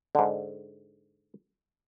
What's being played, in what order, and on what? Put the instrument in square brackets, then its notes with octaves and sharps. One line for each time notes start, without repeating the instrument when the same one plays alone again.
[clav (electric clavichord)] G#2 D3